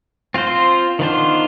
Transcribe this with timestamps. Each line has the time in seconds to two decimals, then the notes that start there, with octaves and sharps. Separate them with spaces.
0.34 C4 F4 C5
0.99 D#3 B3 D4 F4 C5